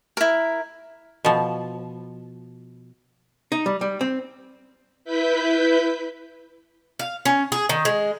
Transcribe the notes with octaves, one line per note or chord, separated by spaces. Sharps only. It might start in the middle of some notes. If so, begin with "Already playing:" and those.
E4 A#4
B2 F3
D#4
G3
G3
C4
E4 B4 G6 B6
F5
C#4
G#4
D#3
G#3